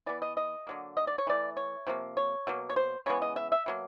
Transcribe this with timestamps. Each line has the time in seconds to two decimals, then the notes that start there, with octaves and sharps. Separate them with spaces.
0.06 E3 G#3 B3 D5
0.22 D#5
0.37 D#5
0.67 D3 F#3 A#3
0.97 D#5
1.07 D5
1.18 C#5
1.27 E3 A3 D5
1.57 C#5
1.87 C3 F3 A#3
2.17 C#5
2.47 B2 F#3 A#3
2.69 C#5
2.76 C5
3.06 C#3 E3 G#3 B3 C#5
3.22 D#5
3.36 E5
3.52 E5
3.66 B2 F#3 A#3